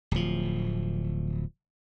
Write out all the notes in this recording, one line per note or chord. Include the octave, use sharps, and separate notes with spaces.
D1 F3